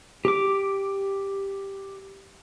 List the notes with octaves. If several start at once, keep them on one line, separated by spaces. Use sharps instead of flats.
G4 D6